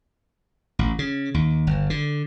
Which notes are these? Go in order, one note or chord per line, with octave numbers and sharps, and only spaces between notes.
A1
C#3
D#2
G1
D3